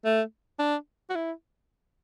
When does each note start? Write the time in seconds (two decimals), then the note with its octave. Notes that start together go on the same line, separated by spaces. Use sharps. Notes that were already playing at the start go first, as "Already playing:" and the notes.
0.05 A3
0.59 D4
1.10 F#4
1.15 E4